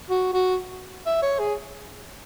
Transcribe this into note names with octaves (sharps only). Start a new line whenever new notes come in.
F#4
F#4
E5
C#5
G#4